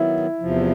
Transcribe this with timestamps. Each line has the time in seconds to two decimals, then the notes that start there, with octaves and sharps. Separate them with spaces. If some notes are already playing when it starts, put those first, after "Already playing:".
Already playing: D#3 F#3 B3 E4
0.40 E2 C3 F3